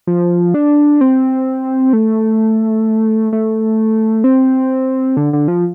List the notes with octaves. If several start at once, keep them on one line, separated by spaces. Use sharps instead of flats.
F3
D4
C4
A3
A3
C4
D3
D3
F3